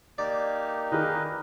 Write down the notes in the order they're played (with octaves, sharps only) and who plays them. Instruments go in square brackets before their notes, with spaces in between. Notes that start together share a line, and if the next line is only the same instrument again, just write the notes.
[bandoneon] A#3 D#4 G4 [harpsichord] D5
[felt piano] D#3 G#4 [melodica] A#4 B4 D#5